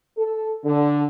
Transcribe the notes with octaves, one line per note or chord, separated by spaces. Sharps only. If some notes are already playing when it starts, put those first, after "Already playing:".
A4
D3